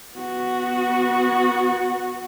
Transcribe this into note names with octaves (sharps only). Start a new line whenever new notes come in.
B3 F#4